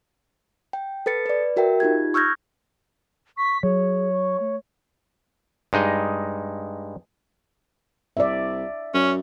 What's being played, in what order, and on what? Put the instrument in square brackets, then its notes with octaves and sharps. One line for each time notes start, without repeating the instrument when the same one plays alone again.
[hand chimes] G5
A4 B4 A6 C#7
B4 D5
F#4 A#4 E5 G5
D#4 F4 G4 G#6
C#6 E6 F6 G6 G#6 A#6
[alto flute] C#6 [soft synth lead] B6
[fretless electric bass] F#3 [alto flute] G#4 [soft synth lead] C#5
[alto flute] C#6
A3
[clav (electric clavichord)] G2 G#3 D#4 D#5
[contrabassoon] C2 [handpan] D5 E5
[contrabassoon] F#2 [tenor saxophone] C#4